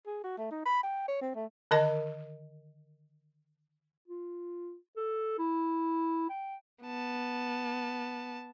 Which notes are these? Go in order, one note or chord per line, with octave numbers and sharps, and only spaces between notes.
G#4
F#4
A3
D#4
B5
G5
C#5
C4
A3
D3 D#3 A#4 D#5 A5
F4
A4
E4
G5
B3 A5